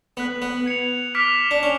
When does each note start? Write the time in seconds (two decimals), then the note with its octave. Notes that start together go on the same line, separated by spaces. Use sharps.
0.17 B3 F#6 B6 F#7
0.42 B3
0.66 G#6 C#7 F7
1.14 D6 F6 B6 D7 F7
1.51 D4
1.63 C#4